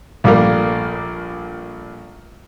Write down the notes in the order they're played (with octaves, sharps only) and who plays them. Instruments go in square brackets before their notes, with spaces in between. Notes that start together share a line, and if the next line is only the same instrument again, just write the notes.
[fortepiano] A#1 G3 A3 A#3 A#4